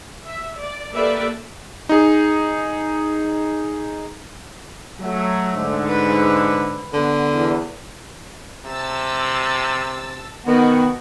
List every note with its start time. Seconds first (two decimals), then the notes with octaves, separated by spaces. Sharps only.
0.24 E5
0.58 D5
0.92 A#3 G4 A4 B4 D5 E5
1.89 D#4 G#4
5.01 F#3 A3
5.55 G#2 D3
5.86 B4
6.94 D3 B3
7.33 E2
8.65 C3 A5 E6 A6
10.46 B2 D#3 B3 F#4